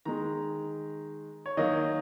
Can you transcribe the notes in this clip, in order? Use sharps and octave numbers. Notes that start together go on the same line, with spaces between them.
D#3 G#3 A#5
C#5
D#3 F#3 A#3 D#5